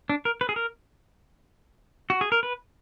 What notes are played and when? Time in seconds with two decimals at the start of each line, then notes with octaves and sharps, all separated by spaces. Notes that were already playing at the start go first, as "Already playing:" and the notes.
0.10 D4
0.25 A#4
0.41 B4
0.49 G#4
0.56 A#4
2.10 F#4
2.21 G#4
2.32 A#4
2.43 B4